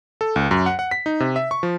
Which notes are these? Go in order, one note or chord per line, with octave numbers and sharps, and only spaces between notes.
A4
C#2
F#2
F#5
F#5
B6
D#4
C3
E5
C#6
F3